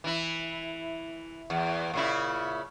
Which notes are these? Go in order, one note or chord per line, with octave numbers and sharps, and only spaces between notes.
E3 E4
E2
A#2 C#3 E4